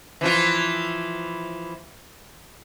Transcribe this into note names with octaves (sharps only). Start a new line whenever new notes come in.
E3 F3 F4